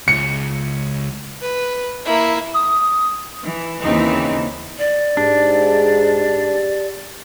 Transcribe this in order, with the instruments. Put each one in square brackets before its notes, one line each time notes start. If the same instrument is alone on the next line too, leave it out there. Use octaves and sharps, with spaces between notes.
[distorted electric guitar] C#2 [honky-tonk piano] C#7
[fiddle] B4
A#3 E4
[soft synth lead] D#6
[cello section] E3
D#2 C#3 E3 C4 D#4
[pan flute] D5
[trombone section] G#2 [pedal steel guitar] D4 [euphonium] G4